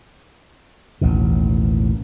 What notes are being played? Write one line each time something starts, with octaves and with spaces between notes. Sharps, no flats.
A1 D#2 B2